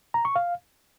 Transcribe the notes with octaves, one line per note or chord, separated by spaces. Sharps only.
A#5
C#6
F5